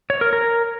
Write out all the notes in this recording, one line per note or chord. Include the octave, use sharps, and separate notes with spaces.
C#5
A#4
A#4